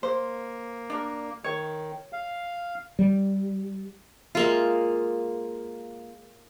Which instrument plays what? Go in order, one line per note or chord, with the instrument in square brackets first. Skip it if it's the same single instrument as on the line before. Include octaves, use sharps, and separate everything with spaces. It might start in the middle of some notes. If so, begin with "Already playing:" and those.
[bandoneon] A#3 [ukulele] C5
[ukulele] D4 A#4
[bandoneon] D#3 [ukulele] C#5
[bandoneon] F5
[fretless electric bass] G3
[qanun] G#3 A#3 F4